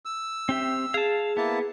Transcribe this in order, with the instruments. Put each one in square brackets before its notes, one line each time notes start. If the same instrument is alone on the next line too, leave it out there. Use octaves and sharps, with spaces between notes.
[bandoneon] E6
[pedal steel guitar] C4 G4 E5
[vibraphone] G#4 [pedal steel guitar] F5 A5
[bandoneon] A#3 E4 A5 [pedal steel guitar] B3